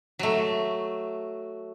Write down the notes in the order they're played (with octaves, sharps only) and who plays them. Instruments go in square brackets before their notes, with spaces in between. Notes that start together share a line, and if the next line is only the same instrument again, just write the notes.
[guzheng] F#3 A3